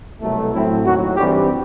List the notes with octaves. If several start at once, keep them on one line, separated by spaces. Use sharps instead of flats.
C2 B2 F#3 A3
A2 F#3 C4 E4
D#2 D#3 F#3 F#4
G2 E3 G3 C4 G4